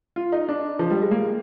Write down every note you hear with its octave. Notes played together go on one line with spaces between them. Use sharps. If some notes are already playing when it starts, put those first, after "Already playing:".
F4
D#4
D4
F3
G3
G#3
A#3